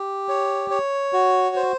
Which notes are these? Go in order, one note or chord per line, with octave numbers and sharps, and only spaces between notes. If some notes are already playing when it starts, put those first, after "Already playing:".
Already playing: G4
C#5
C#5
F#4
C5